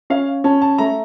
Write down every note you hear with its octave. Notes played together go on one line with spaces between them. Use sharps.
C#4 F5
C#4 A5
A5
A3 A#5